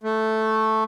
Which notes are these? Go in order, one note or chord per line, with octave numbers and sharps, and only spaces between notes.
A3